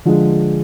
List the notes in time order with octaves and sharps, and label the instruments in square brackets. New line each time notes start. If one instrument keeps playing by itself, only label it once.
[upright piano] D3 F3 G#3